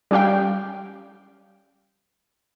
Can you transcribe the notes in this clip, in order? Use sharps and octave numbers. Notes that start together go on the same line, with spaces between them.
G3 C#4 G4 F5 G5